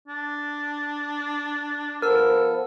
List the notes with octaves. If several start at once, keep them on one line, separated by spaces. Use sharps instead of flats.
D4
F3 B3 A4 A#4 E6